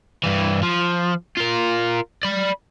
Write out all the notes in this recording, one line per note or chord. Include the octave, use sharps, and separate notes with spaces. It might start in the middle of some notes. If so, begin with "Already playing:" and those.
G2 E3
F3
F4 A#4
D5 B5